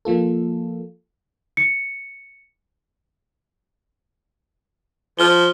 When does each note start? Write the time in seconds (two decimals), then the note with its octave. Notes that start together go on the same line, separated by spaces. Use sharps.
0.05 F3 A#3 F4 A4
1.57 C#7
5.19 F3 F6 G7